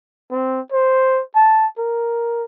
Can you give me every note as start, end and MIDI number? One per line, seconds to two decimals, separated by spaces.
0.31 0.60 60
0.72 1.22 72
1.35 1.67 81
1.78 2.45 70